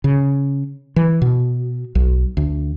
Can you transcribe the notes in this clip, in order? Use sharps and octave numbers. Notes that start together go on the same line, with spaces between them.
C#3
E3
B2
B1
D2